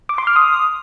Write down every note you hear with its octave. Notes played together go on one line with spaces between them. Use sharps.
D6
C6
F6
D#6